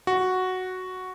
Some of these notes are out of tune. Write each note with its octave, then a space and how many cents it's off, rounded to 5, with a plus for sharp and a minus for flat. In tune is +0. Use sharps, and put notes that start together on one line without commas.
F#4 +0